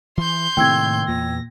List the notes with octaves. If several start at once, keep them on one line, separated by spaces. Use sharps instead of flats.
E3 C6 G6
A2 C3 D#3 A3 A#3 G5 E6 G#6
E2 A#2 A#6